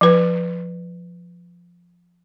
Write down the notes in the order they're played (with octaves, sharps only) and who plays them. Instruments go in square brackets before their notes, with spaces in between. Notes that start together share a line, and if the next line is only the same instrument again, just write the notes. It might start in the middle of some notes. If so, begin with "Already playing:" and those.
[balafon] F3 B4